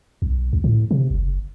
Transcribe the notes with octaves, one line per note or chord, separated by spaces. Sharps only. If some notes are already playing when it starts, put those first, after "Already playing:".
B1
C#2
A2
C3
F#1